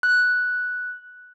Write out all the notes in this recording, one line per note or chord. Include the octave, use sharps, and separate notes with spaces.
F#6